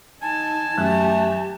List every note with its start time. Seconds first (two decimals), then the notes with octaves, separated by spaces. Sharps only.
0.22 D#4 G#5 A5
0.78 F#2 A3 G4 G#5 F#6